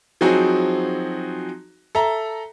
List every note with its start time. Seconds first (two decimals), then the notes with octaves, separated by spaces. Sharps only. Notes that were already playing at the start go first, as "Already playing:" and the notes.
0.21 F3 F#3 C4 D#4 F#4 G#4
1.95 A4 E5 A#5